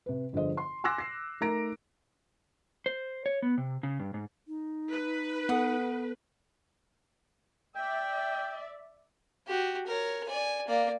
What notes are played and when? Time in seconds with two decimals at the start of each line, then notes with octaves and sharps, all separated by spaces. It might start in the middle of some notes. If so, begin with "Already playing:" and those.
0.06 C3 B4
0.33 G1 D3 F3 G#4 C5 D#5
0.57 C6
0.84 G#5 C6 D6 E6 F#6 A#6
0.98 A#6 C7
1.41 A3 D#4 A#4 A#5 A#6 D7
2.86 C5
3.26 C#5
3.42 B3
3.58 C3
3.83 C#3
4.00 G2
4.14 G#2
4.48 D#4
4.90 B4
5.49 B3 A4 F#5 D#6
7.75 D5 E5 G5
9.47 F#4 G4
9.86 A#4 C#5
10.28 D5 G#5
10.68 A#3 D5